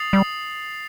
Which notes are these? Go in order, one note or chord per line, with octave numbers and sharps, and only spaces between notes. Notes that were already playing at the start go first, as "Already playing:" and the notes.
Already playing: D#6 A6 C7 F7
G3